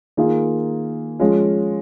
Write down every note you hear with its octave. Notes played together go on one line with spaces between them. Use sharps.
D#3 A#3 F4 G#4
F3 G#3 C#4 F4